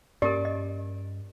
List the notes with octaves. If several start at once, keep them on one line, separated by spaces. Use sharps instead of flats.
G2 A#3 C#4 G4 A#4 D5
D#5